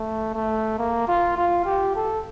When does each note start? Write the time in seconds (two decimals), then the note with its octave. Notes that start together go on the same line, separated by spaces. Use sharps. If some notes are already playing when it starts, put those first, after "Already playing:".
Already playing: A3
0.34 A3
0.78 A#3
1.08 F4
1.37 F4
1.65 G4
1.96 A4